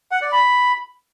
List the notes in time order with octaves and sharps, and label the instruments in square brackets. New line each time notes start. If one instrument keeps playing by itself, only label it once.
[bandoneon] F#5
D5
B5